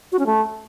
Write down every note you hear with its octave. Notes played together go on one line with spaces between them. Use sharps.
F#4
C#4
A3